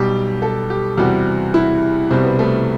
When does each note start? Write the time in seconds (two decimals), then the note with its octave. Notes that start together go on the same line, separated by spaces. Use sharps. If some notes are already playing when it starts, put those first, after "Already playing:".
Already playing: B1 B2 G3 G4
0.42 A4
0.70 G4
0.97 E2 C3 G3 F#4
1.54 E4
2.10 C2 B2 G3 C4
2.24 B3
2.39 A3